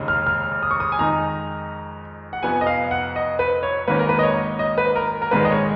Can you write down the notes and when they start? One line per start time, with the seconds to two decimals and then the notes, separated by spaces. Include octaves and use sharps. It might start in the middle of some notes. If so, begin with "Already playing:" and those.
Already playing: F1 D#2 C#3 G#3 D#4
0.08 F6
0.27 F6
0.63 D#6
0.71 C#6
0.80 D#6
0.92 G#5
0.98 F2 D#3 G#3 D#4 A#5
2.33 F#5
2.43 F1 F2 F3 B3 G#5
2.61 D#5
2.66 F5
2.91 F#5
3.16 D#5
3.39 B4
3.63 C#5
3.88 G#1 G#2 D#3 A#3 C#4 B4
3.99 A#4
4.09 B4
4.19 D#5
4.23 C#5
4.59 D#5
4.78 B4
4.96 A#4
5.22 A#4
5.31 A#1 G#2 D#3 G#3 B4
5.45 D#5
5.51 C#5